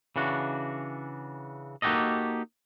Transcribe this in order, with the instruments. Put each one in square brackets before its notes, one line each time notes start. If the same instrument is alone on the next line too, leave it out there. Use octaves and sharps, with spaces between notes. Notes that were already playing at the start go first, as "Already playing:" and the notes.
[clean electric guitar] C#3 E3 D4 F#4
A#3 D#4 F#4 G4 A4 D#5